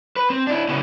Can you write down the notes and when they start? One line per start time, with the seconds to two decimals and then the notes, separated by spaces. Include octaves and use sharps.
0.16 B4
0.30 C4
0.47 D4 E4
0.68 C#3 B3 C#4 E4 F#4